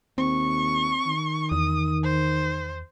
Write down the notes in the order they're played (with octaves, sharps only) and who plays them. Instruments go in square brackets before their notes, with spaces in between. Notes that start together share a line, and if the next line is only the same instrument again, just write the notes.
[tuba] D#2 [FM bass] C4 [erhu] C#6
[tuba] D#3
[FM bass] E2 [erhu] D#6
[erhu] C5